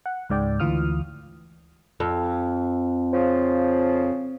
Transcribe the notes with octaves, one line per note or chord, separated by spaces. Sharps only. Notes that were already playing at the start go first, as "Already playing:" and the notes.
F#5
C#2 G#2 D5 G5
D2 E3 F4 D#6 F6
F2
C#3 F3